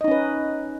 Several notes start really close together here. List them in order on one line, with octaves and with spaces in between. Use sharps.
D#5 D#4 C#4 B4